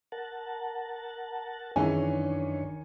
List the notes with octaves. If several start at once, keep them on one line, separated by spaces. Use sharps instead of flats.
A#4 F#5 A5
F#2 D#3 E3 G#3 C#4 D4 C#5 G#5